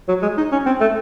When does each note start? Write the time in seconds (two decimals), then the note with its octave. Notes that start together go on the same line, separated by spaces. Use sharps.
0.08 F#3
0.22 G#3
0.37 D#4
0.52 C#4
0.66 C4
0.81 A3